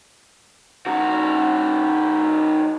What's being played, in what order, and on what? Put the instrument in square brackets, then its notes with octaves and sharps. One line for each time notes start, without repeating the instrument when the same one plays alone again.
[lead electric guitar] D#3 F#4